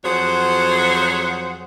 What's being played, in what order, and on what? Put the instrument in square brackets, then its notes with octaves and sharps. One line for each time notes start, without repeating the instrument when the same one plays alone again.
[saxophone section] F2 F#3 G#4 C5 C#5 F#5